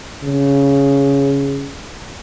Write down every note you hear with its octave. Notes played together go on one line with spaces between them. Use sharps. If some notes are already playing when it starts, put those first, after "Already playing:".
C#3